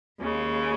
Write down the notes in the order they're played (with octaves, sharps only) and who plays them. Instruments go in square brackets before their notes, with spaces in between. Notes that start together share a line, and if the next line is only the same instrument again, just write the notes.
[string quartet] D#2 C#3 G#3